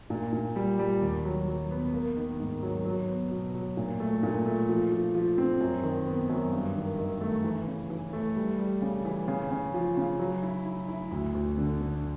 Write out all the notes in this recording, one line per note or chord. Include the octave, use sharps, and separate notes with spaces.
A#2
A#2
G3
G3
D#2
F#3
F#3
B3
A#3
D#3
G#2
F#3
F#3
B3
B2
F#3
A#2
A3
A#2
A3
F3
F3
F3
C4
F#2
D#3
B3
F#2
G2
D#3
D#3
A3
E3
C#3
E3
A3
G3
G3
C#3
E3
C#3
C#3
F3
C#3
F#3
E4
E4
E4
D2
D2
D3
D3